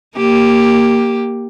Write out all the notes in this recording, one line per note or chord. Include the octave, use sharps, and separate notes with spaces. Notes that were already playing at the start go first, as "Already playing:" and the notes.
A#3 G4